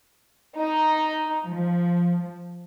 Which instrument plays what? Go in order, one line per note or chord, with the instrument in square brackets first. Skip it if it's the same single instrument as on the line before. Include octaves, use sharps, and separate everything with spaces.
[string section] D#4
F3